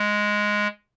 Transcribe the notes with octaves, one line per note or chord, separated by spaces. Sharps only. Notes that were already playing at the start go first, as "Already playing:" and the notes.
Already playing: G#3